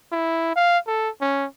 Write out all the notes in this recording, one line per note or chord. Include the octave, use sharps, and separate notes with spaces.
E4
F5
A4
C#4